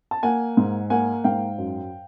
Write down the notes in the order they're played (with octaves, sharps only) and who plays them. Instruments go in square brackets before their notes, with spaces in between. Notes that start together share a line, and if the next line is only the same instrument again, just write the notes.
[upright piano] A5
A#3 F#5 G#5
G#2
A#3 F#5 G#5
G#2 F5 G5
F#2